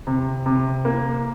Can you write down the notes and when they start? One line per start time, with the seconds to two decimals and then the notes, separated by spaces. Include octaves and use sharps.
0.07 C3
0.46 C3
0.85 A#3